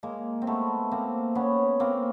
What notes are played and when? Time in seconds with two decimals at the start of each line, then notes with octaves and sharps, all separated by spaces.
0.03 G#3 A#3
0.42 C4
0.47 A3 B3
0.91 A#3 C4
1.35 B3 C#4
1.80 A#3 C4